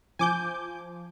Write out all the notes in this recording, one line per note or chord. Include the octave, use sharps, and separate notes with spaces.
F3 G#5 D6 G6